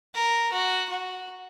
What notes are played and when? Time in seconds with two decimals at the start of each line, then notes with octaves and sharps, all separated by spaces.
0.15 A#4
0.52 F#4
0.90 F#4